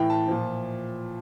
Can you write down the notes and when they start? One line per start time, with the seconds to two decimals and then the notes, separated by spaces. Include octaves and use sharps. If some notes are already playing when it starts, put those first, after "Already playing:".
Already playing: A2 E3 G5
0.10 A5
0.28 A#2 F3